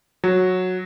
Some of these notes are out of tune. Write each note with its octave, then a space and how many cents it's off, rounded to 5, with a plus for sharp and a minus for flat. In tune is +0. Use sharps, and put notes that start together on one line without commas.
F#3 -10